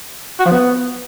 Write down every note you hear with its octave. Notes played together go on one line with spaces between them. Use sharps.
F#4
F3
B3